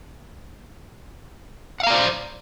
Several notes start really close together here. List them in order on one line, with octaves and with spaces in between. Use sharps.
F#5 F5 A#5 D5 C5